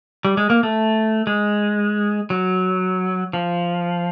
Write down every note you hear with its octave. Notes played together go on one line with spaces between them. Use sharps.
G3
G#3
A#3
A3
G#3
F#3
F3